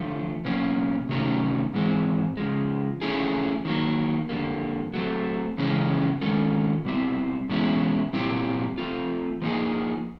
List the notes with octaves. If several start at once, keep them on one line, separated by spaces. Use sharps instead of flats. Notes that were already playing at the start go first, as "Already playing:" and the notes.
Already playing: D3 F3 A3
B2 F#3 A#3 C#4
C3 D#3 F#3 A3 C#4
G#2 E3 G#3 C4
C#3 F3 G#3
F3 A3 C#4 E4 G#4
D#3 F#3 A#3
F2 D3 G3 A#3
F#3 A3 C4
F2 C#3 E3 G#3 C#4
D#3 G#3 C#4 F4 A4
B2 G3 C4 E4
E2 B2 G#3 C#4 E4
A#2 G3 C4 E4 G4
F3 A3 C4 F4
F3 A#3 D#4 G#4